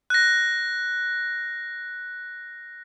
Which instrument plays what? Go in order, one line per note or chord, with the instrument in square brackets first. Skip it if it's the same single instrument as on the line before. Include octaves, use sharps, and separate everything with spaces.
[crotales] F#6 A#6